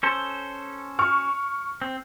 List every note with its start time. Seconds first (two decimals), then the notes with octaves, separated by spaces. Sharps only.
0.03 C#4 A4 C5
0.99 C#6 F6
1.82 C4